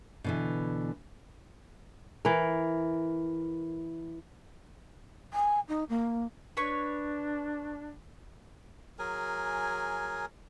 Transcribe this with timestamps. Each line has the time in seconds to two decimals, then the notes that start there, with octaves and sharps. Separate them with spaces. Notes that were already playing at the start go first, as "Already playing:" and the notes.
0.24 B2 D3 E3
2.25 E3 A#4
5.33 G#5
5.68 D#4
5.89 A#3
6.57 D4 B4 C#5 C#6
8.99 F#3 G#4 A#4 G#5